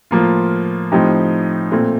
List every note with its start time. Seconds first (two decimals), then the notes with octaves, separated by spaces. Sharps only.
0.11 A2 F3 A#3 F4
0.92 A2 F3 C4 D#4 G4
1.71 A#2 A3 C4